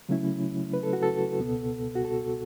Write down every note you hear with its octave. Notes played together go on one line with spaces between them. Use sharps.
C#3 F#3 A3 C#4 E4
B4
A4
F#4
A4
C#2 B2 B3
F#4
A4